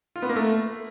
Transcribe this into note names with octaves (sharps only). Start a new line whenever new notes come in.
F4
B3
A#3
A3